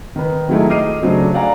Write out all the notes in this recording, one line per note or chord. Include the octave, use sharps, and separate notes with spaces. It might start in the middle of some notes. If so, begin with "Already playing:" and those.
D#3 B4
D#3 F#3 G#3 A3 D#4 E4
D#5 D6 F6 C7 D#7
C#3 F#3 A3 C#4 D4 C5
D5 F5 F#5 G#5 A#5